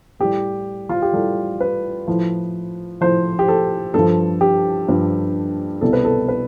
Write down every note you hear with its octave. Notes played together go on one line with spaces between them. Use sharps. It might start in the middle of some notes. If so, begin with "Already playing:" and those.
A2 G3 G4
F4
G4
A2 G3 A4
B4
A2 F3
A2 F3 C5
G4
A4
G2 F3 A4
G4
G2 F3
C2 B2 G3 A4
B4
A4
B4